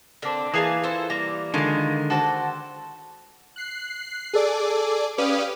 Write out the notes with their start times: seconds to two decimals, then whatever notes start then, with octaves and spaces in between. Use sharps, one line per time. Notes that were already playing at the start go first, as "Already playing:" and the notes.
0.22 D3 C4 D4 A#4
0.54 E3 A#3 G#4 F5 A5 A#5 D#6
0.83 F4 A4 C5
1.10 G3 A#3 A#5
1.54 D3 D#3 G#3 F4 A#4
2.10 F#4 A4 C5 G5 A5 D6
3.56 F#6 C7
4.33 G#4 A4 D5 D6
5.18 C#4 G4 B4 D5 F5 D#6